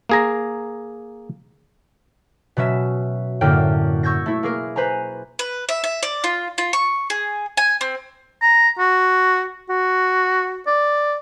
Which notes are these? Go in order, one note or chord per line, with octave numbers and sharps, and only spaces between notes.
A#3 G#4 A#5
B2 F#3 C#4 E5 E7
F#2 A2 D3 A#3 G5 F6
C#6 E6 G6 G#6 A#6
A3 E4
A#3 G#4 A#4
B4 C5 G#5 A#5
B4
E5
E5
D5
F4
F4
C#6
G#4
G#5
C4
A#5
F#4
F#4
D5